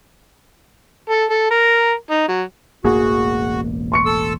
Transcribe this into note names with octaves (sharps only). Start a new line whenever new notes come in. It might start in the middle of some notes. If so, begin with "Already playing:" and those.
A4
A4
A#4
D#4
F#3
E1 A1 A#3 F#4 G#4
C6 C#6 C#7
A4 E6